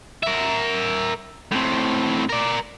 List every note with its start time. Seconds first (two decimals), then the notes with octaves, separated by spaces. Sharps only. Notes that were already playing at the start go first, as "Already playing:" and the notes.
0.23 A#4 E5
1.52 A2 C4
2.29 A#4 D5